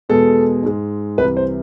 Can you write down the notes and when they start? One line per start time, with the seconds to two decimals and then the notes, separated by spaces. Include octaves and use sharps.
0.09 E2 B2 G#3 A4
0.63 G#2 G#3
1.18 C2 C3 E3 B4
1.37 C5